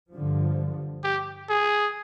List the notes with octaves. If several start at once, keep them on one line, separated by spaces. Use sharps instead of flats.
G2 D3 F3
G4
G#4